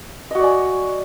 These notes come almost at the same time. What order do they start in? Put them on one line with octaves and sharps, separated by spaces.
D#5 F#4 D5 G#5